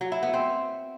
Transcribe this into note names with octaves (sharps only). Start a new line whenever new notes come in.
F#3
E4
B3
C4